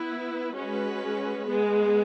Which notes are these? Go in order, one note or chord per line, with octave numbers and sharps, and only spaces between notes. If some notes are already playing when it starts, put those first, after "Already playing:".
Already playing: B3 E4 B4
G#3 C#4 F#4 B4
G#3 B3 G#4